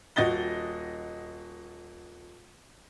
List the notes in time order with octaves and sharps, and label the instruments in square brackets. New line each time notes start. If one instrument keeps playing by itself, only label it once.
[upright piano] D#1 F#4 D#5 A6 G7